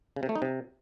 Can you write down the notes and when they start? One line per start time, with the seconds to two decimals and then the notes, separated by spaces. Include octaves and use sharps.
0.16 C#3
0.23 C3
0.29 A3
0.35 D#4
0.42 C3